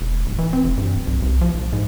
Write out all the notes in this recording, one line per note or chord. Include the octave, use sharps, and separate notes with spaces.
E1
D1
E3
C4
F1
G2
D1
B1
C2
F3
A#1
G#2